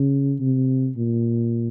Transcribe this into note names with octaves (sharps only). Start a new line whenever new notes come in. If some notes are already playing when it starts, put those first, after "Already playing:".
Already playing: C#3
C3
A#2